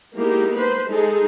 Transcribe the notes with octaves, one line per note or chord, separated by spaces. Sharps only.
G#3 A#3 B3 D#4 E4 G4
B4 C5
G#3 D#4 G#4 A4